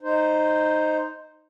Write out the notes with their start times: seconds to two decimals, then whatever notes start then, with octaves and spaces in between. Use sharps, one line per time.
0.01 D#4 C5